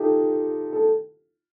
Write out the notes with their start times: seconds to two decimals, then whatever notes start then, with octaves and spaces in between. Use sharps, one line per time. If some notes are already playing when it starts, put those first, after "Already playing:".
Already playing: D#4 F4 G4 A4
0.73 A4